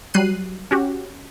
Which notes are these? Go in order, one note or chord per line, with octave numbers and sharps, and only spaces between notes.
F#3 G3 F#6 C7 D#7
C#4 F#4 G4